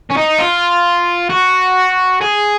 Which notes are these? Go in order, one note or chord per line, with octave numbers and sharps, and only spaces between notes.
C#4
D#4
F4
F#4
G#4